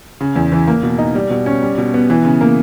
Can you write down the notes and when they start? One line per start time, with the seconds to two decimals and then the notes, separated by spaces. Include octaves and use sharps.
0.21 C#3
0.36 E2
0.52 E3
0.68 A#3
0.83 B2
0.98 D#4
1.15 G3
1.30 B2
1.46 C#4
1.62 G3
1.78 B2
1.94 B3
2.10 E3
2.25 C#3
2.41 A#3